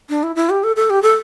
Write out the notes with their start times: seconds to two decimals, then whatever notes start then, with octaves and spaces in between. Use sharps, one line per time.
0.09 D4
0.23 E4
0.36 E4
0.50 G4
0.64 A4
0.76 A4
0.90 G4
1.03 A4